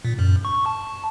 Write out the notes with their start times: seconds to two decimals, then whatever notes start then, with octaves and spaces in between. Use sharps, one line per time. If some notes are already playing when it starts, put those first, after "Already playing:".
0.05 A#2
0.19 F#2
0.45 C#6
0.66 A5